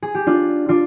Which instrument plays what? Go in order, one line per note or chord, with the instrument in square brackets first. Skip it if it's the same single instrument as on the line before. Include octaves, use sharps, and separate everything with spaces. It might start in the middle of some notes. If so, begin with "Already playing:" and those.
[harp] G#4
G4
D4 F4
D4 F4